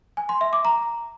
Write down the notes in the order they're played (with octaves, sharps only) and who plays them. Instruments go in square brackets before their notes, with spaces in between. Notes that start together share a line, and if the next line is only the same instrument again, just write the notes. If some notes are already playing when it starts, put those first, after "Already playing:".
[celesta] G#5
C6
E5
D6
A#5